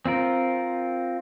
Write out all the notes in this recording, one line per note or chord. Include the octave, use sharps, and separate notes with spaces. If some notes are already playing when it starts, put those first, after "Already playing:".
C4 F4 A#4